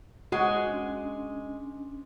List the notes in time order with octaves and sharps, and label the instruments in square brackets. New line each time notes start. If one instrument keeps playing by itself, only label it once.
[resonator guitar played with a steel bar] G#3 [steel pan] F#4 [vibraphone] C5
[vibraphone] C#4 D4 C6